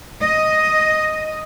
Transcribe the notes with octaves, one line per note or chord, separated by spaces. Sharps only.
D#5